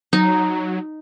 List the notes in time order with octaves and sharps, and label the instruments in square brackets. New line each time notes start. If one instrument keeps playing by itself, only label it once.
[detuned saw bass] F#3 [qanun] D#4